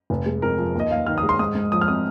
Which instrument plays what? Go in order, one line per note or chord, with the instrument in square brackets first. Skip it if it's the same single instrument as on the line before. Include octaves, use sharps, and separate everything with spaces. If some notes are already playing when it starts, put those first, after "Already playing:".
[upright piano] F1
G#3
F2 A#4
F3
D#2 D#5
D#2 F5
D#3 F6
D#6
G#3
C6
G#2 D#6
G#2
F3 D#6
F6
C4 D#6